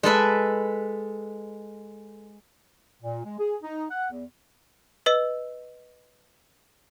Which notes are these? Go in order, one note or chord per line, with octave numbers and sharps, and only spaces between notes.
G#3 A4 B4 E5
A#2
G#3
G#4
D#4
F#5
E2
B4 D#5 E6